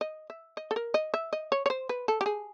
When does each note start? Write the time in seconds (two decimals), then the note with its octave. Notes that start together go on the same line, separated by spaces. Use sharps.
0.01 D#5
0.30 E5
0.57 D#5
0.71 A4
0.76 A#4
0.94 D#5
1.14 E5
1.33 D#5
1.52 C#5
1.66 C#5
1.70 C5
1.89 B4
2.08 A4
2.21 G4
2.26 G#4